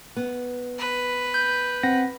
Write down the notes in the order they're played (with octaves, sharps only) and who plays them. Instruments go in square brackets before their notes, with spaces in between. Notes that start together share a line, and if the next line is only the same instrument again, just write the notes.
[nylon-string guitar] B3
[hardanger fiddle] B4
[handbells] G6
[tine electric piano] C4 F#5 A#6